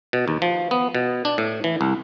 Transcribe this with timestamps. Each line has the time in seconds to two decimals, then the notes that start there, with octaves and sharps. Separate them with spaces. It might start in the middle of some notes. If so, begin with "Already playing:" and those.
0.13 B2
0.28 D#2
0.42 F3
0.71 B3
0.95 B2
1.25 D4
1.38 A2
1.64 E3
1.81 C2